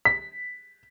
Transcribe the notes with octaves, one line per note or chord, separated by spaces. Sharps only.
B6